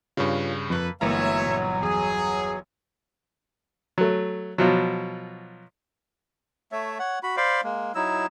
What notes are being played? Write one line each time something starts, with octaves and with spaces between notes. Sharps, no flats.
G2 C#3 F4 C#5 F5
F2 A#3 A4 B4
G1 E3 F#3 G#3 A#3 C#5 E5 A#5
A#2
E2 G#4
F#3 A3
B2 F3 F#3
A3 C#5 E5
C#5 F#5
F#4 B5
C5 D5 F5 B5
G#3 A#3
F#3 D#4 E4 E6